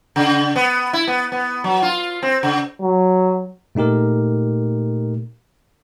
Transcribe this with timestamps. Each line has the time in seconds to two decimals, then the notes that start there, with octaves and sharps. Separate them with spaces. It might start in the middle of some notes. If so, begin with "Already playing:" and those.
0.16 C#3
0.56 B3
0.93 E4
1.07 B3
1.32 B3
1.64 F#3
1.82 F4
2.22 C4
2.43 C#3
2.82 F#3
3.75 A#2 A3 D#4 G4 A#4